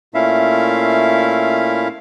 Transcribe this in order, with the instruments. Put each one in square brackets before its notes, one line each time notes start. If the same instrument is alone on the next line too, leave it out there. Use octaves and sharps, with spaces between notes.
[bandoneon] A#2 A3 C#4 E4 E5 F5